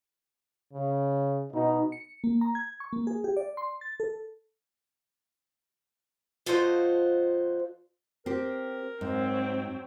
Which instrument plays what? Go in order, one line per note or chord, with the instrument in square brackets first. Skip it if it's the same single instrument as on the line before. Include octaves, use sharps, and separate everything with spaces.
[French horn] C#3
[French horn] B2 [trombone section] D#4
[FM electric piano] C#7
A#3
A#5
G#6
C#6
A#3
G#4
G4
D5
C6
A6
A4
[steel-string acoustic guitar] F3 F4 F#4 A4 C5 D#5
[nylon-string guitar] C4 G4 [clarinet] A#4
[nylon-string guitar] G#2 [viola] F#3 C4